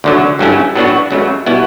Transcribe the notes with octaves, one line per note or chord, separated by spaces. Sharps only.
D2 D3 F#3
G2 F#3 A3 C#4 E4
A2 F#3 B3 D4 F#4
C#2 C#3 F#3 A3
B2 G3 B3 E4